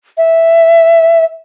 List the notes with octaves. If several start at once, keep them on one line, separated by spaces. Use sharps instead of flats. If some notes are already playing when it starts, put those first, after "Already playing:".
E5